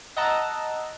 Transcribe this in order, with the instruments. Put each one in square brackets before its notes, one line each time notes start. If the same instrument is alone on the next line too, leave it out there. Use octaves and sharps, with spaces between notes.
[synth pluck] D#5 F#5 A5 A#5 E6